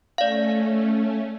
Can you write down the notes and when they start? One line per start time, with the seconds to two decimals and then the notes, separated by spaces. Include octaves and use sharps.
0.18 A3 C#4 D5 F5